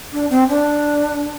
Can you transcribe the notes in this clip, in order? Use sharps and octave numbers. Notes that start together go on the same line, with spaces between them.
D4
C4
D4